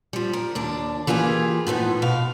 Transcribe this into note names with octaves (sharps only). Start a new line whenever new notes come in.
F3 G3
A#4
D#2 D4
E3 A#3 F4 G4 G#4
A2 F3 B3 D#4
B2 F5